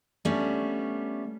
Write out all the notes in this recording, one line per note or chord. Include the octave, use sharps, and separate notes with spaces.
G3 A3 B3 C#4 D4